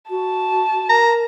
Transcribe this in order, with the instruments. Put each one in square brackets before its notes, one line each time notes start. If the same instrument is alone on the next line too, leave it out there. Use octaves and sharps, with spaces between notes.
[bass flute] F#4 [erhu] A5
[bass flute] A#4 [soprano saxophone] A#5